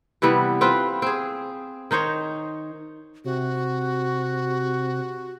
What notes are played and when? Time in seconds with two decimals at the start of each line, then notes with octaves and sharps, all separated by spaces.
0.22 C3 E3 G3 B3
0.61 C4 F4 B4
1.02 C4 G#4
1.91 D#3 D#4 C5 C#5
3.24 C3 F#4